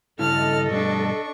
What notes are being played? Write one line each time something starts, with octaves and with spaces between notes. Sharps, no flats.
G2 C#3 E4 A4 D#5 A5 F6
G2 B2 G3 D4 C#6